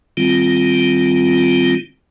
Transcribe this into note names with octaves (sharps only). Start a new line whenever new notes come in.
D#3 G3 C4 F4